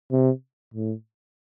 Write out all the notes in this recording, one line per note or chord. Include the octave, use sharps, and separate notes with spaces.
C3
A2